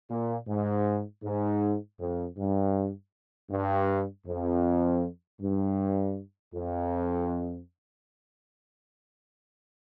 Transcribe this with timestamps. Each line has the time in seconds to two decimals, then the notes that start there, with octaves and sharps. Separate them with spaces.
0.10 A#2
0.48 G#2
1.24 G#2
2.00 F2
2.38 G2
3.51 G2
4.27 F2
5.41 G2
6.54 F2